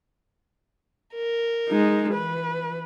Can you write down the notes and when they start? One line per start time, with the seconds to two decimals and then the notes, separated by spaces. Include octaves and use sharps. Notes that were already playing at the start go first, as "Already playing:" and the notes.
1.14 A#4
1.69 G#3 D#4
2.14 E3 B4